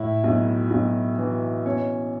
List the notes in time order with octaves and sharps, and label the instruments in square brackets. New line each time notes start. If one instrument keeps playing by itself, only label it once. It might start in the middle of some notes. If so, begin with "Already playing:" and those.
Already playing: [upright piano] A2 E4 E5
B1
B1
E3
B2 C#4 C#5